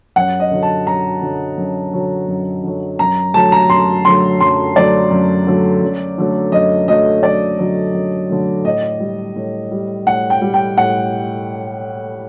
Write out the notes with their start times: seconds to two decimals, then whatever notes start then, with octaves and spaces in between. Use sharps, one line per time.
0.16 F#2 F#5
0.40 D#5
0.51 D3 F#3
0.63 A5
0.87 F#2 A#5
1.22 D3 F#3
1.58 F#2
1.93 D3 F#3
2.28 F#2
2.63 D3 F#3
2.99 F#2 A#5
3.34 D3 F#3 A3 A5
3.52 A#5
3.70 F#2 C6
4.05 D3 F#3 A3 C6
4.40 F#2 C6
4.76 D3 F#3 A3 D5
5.11 F#2
5.47 D3 F#3 A3
5.82 F#2
6.18 D3 F#3 A3
6.52 F#2 D#5
6.88 D3 F#3 A3 D#5
7.23 F#2 D5
7.58 D3 F#3 A3
7.94 F#2
8.30 D3 F#3 A3
8.64 A2 D#5
9.00 G3
9.36 A2
9.71 G3
10.06 A2 F#5
10.30 G5
10.42 G3
10.54 G5
10.77 A2 F#5